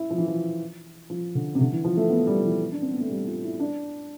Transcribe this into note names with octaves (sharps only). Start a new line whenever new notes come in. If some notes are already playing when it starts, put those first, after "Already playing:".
Already playing: E4
F3
E3
F3
F3
D3
C3
D3
E3
F3
A3
B3
G3
F3
E3
D4
C4
B3
A3
G3
F4
E4
D4